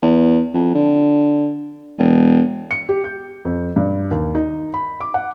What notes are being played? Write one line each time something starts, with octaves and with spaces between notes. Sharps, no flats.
E2
F2
D3
E1
C#7
G4
G6
F2
G2
D#2
D#4
B5
D6
F#5